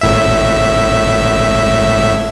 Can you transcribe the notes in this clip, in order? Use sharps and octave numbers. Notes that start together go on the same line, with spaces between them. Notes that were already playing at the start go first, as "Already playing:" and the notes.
G#1 A2 E5